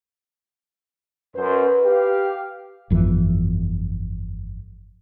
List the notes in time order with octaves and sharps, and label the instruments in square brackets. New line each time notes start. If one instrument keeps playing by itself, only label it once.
[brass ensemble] F#2 C5 [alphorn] B4
[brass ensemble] G4 F5
[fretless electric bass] G1 F2 D3 E3